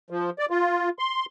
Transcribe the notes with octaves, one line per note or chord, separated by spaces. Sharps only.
F3
D5
F4
C6